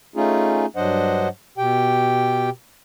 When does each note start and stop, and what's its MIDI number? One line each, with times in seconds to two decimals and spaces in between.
0.16 0.66 57
0.16 0.66 61
0.16 0.66 63
0.16 0.66 65
0.16 0.66 68
0.76 1.28 43
0.76 1.28 54
0.76 1.28 62
0.76 1.28 72
0.76 1.28 75
0.76 1.28 78
1.58 2.50 47
1.58 2.50 67
1.58 2.50 79